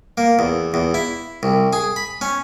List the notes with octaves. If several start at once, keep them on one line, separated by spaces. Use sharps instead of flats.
A#3
E2
E2
E4
C2
G#4
B5
C#4